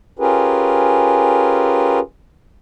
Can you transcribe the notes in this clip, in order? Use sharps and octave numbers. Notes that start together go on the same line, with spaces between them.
C#4 F4 G4 G#4 A#4 B4